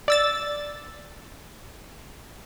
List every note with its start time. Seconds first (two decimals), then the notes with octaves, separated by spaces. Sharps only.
0.08 D5 E6 A6